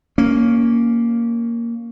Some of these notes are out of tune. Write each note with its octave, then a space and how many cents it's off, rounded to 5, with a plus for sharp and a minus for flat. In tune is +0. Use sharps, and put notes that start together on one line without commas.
A#3 +0 C#4 +10